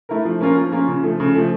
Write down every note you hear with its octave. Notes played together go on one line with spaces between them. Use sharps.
A3 E4 A#4
F3
A#3 C#4 F4 A#4
F3
A#3 C#4 F4 A#4
C#3
F3 A3
C#3
F3 A3